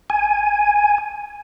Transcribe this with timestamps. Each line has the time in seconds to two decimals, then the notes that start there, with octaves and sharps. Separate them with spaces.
0.10 G#5